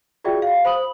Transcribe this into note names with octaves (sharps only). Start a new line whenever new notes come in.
F4 F#4 G#4 D5 E5 G5
F5
C5 B5 D#6 F#7